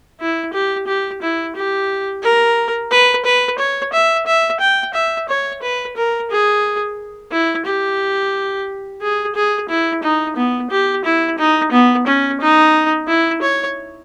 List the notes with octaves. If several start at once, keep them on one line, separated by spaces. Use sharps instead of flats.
E4
G4
G4
E4
G4
A#4
B4
B4
C#5
E5
E5
G5
E5
C#5
B4
A#4
G#4
E4
G4
G#4
G#4
E4
D#4
B3
G4
E4
D#4
B3
C#4
D#4
E4
C#5